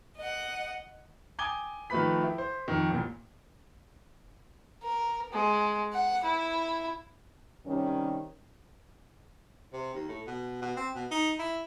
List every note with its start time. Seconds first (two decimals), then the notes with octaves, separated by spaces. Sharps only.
0.17 D#5 F#5
1.39 G5 G#5 D6 D#6 G#6 G7
1.90 D#3 F3 A3 B4 B5 B6
2.23 E4
2.38 C5
2.68 F2 D#3
2.90 A1 D#2 A#2
4.83 A#4
5.33 G#3
5.94 F#5
6.24 E4
7.66 C3 D#3 G3 C#4
9.73 C3
9.94 D#2
10.09 A2
10.27 B2
10.62 B2
10.77 C4
10.95 B2
11.11 D#4
11.39 E4